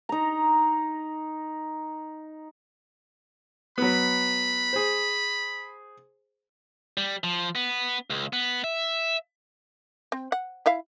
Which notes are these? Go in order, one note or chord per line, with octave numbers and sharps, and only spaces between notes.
D#4 A#5
F#3 B3 B5
G#4 C5
G3
F3
B3
C#2
B3
E5
C4
F#5
E4 E5 F5